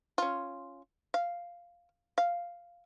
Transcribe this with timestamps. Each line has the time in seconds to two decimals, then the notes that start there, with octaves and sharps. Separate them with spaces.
0.18 C#4 F4
1.14 F5
2.18 F5